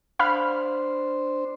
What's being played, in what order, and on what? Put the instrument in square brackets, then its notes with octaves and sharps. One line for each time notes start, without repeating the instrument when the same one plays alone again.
[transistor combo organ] D4 C5 [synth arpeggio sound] F5 B5 F6